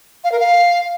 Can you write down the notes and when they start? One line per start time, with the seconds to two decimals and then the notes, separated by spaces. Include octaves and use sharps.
0.24 F5
0.32 A#4
0.40 F5